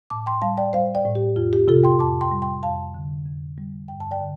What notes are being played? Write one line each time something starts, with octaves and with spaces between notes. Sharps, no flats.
A2 A5 D6
G5 C6
G3 F5 A5
D5 G5
G3 C5 F5
D5 G5
A2
G4
F2 F4
G4
C3 F4 A4
G5 C6
F2 A5 D6
G5 C6
G3
G5 C6
F2 F5 A5
D3
F2
G3
G2 G5
A5
D5 G5
D3